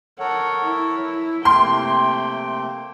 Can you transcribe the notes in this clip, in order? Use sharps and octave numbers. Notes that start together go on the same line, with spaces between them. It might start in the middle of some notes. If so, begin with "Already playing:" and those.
A4 A#4 C#5 F#5
E4
C3 A3 A#3 G5 C6